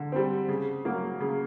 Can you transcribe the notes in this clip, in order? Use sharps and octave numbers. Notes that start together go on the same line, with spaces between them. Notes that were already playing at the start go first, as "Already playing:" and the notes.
Already playing: D3
G3 C4
C#3
F#3 A#3
C#3